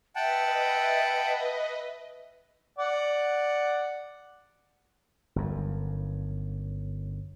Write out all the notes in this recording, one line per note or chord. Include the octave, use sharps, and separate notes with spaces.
B4 D#5 E5 F#5 G5 A5
D5 F#5
G1 F#2